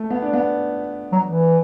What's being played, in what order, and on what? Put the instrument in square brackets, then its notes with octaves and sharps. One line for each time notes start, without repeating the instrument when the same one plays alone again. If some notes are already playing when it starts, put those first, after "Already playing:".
Already playing: [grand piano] A3
B3
D4
B3
[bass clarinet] F#3
E3